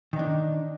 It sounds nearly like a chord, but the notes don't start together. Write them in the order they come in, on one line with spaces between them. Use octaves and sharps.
D#3 D#4 D4